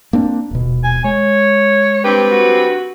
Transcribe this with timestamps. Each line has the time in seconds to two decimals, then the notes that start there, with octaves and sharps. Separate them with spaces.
0.13 A#3 C4 D4
0.51 D#1 B2
0.84 G#5
1.04 G#3 C#5
2.04 G2 C4 G4 B4
2.31 F#4